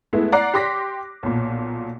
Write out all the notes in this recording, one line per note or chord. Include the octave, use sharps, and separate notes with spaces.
G#3 A3 B3 E4
D5 F#5 A#5 D6 F#6 C7
G4 C6 D6 A#6 B6
B1 A#2